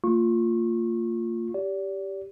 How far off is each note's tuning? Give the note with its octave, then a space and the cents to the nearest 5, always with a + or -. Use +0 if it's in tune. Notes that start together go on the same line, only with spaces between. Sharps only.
A#3 -40 F4 +0 C#6 -25
G4 +0 D5 -35